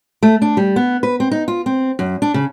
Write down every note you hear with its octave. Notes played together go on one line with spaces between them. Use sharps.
A3
D4
G3
B3
B4
C4
D#4
F4
C4
F#2
D4
C#3